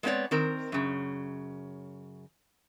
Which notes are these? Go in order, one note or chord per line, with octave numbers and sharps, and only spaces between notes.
G#3 A3 B3 C4 C#5 D5
D#3 C4 A#4
F#2 C#3